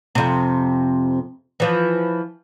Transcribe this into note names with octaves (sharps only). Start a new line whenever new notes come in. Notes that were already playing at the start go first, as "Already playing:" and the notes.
F2 C3
E3 F3